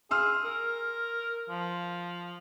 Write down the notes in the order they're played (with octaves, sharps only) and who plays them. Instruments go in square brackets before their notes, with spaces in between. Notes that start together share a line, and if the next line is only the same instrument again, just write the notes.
[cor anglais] G#4 [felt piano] C6 E6 F6
[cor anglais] A#4
F3